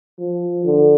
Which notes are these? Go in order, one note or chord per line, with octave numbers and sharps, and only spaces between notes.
F3
D3